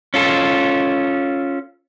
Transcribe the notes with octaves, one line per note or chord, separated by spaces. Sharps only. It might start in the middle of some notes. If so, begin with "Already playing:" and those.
C#4 F4 A4